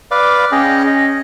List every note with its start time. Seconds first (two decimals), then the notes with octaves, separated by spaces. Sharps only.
0.11 B4 D5 F5
0.52 C#4 G#4 D#5 G5
0.87 D#5